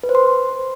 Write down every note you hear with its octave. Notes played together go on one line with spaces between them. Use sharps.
B4
C5
C6